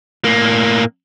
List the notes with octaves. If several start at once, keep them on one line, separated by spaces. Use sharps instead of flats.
A2 A#3